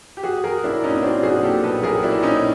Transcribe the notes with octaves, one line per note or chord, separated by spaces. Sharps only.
G4
F#3 F#4 G#4
F#3 G#4 A#4
B1 D4 E4
A#2 C#4 D#4
C#4
F#3 C4 D4
B1 F#4 G#4
A#2 G4 A4
B1 A4 B4
B1 G#4 A#4
F#3 D4 E4
A#2 C#4 D#4